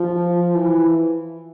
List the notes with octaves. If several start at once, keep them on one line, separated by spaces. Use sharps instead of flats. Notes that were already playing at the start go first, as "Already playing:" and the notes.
Already playing: F3
E3